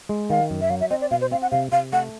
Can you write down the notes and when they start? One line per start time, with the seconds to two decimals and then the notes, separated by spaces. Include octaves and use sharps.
0.09 G#3
0.30 D#3 F5
0.50 F#2
0.61 E5
0.70 F#3 F5
0.80 E5
0.90 C4 D#5
1.01 D5
1.11 B2 F5
1.21 C5
1.31 C4 F5
1.42 F#5
1.51 C3 F5
1.72 C3 F5
1.93 A3 F#5